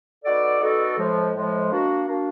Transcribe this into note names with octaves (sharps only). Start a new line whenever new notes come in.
B3 D#4 F#4 A4 D5
B3 D#4 F#4 A4 D5
A2 F3 G#3
A2 F3 G#3
A#3 D4 F#4
A#3 D4 F#4